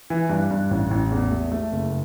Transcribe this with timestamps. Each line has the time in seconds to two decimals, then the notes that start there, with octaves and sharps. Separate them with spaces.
0.10 E3
0.29 G2
0.50 G2
0.71 A1
0.91 A1
1.11 E2
1.31 A3
1.52 A3
1.72 F#1